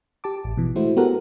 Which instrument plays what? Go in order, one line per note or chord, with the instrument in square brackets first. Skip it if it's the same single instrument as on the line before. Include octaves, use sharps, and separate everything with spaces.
[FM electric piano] G4 A5 D6
A1
B2 E3
G#3 A3 E4 F#4 C5
B3 F#4 G4 A4 A#4 F#5